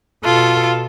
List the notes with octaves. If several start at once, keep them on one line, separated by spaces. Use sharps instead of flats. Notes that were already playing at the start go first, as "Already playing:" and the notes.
B2 F4 A4